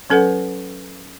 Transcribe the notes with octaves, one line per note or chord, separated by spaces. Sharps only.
F#3 C#4 A4 B4 F#5